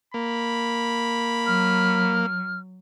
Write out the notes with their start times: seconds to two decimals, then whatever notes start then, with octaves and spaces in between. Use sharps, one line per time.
0.14 A#3 B5
1.47 F#3 F6